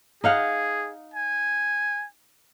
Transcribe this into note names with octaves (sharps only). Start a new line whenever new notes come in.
D#4 G#4 F5 F#5
G#5